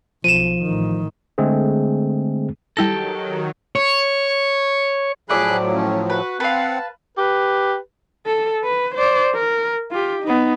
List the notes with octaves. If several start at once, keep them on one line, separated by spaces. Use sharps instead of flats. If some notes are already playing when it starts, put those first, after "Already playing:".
B1 F3 D#7 E7
A1 D#3
D3 G#3 A3 C4 G#4
D#3 F#3 G3 E4 G4 A4 A#6
C#5
A2 F3 F#3 A3 G#4 D5 B5 F#6
C#4
F#4 B4
C4 B4 F5 F#5 A5
G4 B4
A4
B4
C5 D5
A#4
F4 G4
B3 D#4